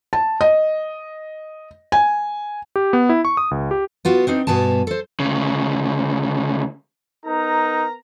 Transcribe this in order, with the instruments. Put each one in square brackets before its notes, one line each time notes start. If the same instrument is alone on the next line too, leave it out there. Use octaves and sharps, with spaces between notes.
[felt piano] A5
D#5
G#5
[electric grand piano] G4
B3
E4
C#6
D#6
C#2
G4
[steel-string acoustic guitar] B3 F4 F#4
C4 D4 D#4
G2 B2 B3 G#5 A5
A4 C5
[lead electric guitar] D2 C#3
[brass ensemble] B3 A#4 A#5 [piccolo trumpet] D#4